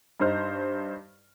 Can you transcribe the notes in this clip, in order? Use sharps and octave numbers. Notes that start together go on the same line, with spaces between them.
G2 D#4 C5 F6